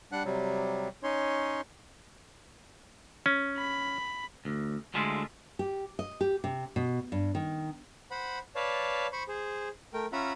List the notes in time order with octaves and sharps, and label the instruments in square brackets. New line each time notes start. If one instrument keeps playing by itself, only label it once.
[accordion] G3 D4 F#5 F#6
C3 F#3 G3
C#4 D#4 C#5 C6
[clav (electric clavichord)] C#4
[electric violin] B5
[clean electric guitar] D2
D2 D3 G#3 E4 F4
[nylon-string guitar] G4
D#5
G4
C3
B2
G2
D#3
[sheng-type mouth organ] C5 F#5 B5
B4 C#5 D5 F5 A5
C5 B5 C#6
G#4 C5
A3 A#4 G5
C#4 F4 E5 F#5 A#5 B5